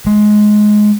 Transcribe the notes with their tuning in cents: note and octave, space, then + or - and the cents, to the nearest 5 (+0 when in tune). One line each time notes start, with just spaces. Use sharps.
G#3 +15